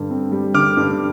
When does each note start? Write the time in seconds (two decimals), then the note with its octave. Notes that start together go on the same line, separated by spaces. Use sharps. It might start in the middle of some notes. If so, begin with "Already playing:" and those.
Already playing: G2 D3
0.10 C4
0.32 G3
0.54 D3 D6 F6
0.77 G2